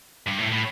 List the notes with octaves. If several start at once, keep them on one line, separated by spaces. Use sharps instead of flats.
G2
A2
A2